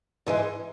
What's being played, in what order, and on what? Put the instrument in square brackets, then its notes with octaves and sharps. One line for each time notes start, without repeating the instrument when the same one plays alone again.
[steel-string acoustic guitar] G#2 E3 G#3